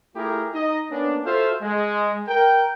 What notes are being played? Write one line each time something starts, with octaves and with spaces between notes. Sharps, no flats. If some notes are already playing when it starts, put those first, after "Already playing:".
A3 E4 F4 G4 G#4 A#4
D#4 D#5
A#3 B3 C#4 D4
F4 F#4 A4 C5 E5 F5
G#3
A#4 G5